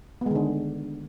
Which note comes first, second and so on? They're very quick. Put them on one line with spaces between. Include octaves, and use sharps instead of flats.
B3 G#3 D#3 D3